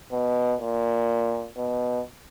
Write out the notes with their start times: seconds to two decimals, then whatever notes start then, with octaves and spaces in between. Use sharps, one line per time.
0.12 B2
0.60 A#2
1.57 B2